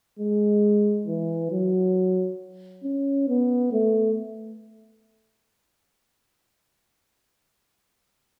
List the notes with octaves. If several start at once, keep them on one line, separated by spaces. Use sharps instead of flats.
G#3
E3
F#3
C#4
B3
A3